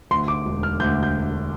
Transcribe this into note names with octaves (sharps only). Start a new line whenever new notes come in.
D2 C6
D6
E1
F6
D2 G6
G6